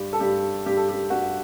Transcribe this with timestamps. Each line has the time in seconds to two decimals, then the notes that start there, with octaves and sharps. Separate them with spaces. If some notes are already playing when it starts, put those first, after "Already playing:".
Already playing: G2 G4
0.13 A4
0.20 G2 G4
0.66 G2 G4
0.77 A4
0.89 G4
1.10 G2 F#4